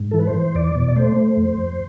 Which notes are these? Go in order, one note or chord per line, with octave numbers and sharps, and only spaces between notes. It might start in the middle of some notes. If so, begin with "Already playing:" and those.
Already playing: G#2
E3 A4
B4
C5
E3
E2 D5
B2
D5
A3 C5
A3
F2
F2